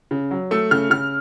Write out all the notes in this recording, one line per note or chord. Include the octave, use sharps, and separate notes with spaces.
C#3
F#3
A3 E6
C#3 F6
C#3 F6